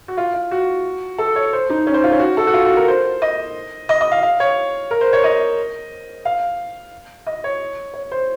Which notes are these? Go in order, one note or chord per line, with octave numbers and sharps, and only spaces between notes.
F#4
F4
F4
F#4
A4
C#5
C5
D#4
C#4
C5
F4
C#4
F#4
A4
F#4
F4
F#4
A#4
C5
D#5
D#5
D#5
F5
F5
C#5
A#4
C5
C#5
D#5
F5
D#5
C#5
C#5
C5